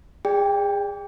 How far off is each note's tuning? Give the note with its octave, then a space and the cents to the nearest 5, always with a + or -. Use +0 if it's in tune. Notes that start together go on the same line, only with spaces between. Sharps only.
G#4 -30 D5 +0 G5 +15